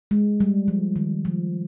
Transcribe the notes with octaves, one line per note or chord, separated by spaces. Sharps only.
G#3
G3
F3
D#3
F3